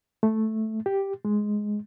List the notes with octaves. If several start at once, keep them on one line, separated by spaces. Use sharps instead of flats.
A3
G4
G#3